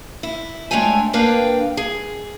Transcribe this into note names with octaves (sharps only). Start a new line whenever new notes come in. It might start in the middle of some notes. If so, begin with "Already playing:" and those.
E4
G#3 A3 D4 C#5 G5 G#5
A#3 D4 A#4 B4 F5 G5
G#4